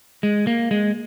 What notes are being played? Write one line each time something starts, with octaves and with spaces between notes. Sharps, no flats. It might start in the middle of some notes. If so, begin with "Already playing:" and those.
G#3
A#3
G#3